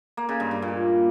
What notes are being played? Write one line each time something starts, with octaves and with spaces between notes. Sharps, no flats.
A#3
C#3
G2
G2
A#2